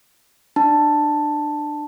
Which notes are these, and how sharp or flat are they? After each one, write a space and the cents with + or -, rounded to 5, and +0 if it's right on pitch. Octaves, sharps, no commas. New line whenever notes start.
D4 +25 A5 +5